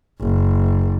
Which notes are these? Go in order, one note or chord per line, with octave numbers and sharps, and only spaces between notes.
F#1